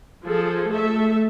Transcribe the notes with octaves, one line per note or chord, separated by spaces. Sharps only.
F3 G#4 A4
A3 A4 E5